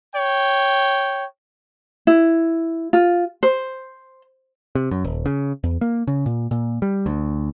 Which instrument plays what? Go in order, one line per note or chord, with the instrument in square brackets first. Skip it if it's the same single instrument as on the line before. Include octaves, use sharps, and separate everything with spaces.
[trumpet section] C#5 G5
[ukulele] E4
F4
C5
[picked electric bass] C3
F#2
D#1
C#3
E2
A#3
C#3
A#2
A#2
G3
D2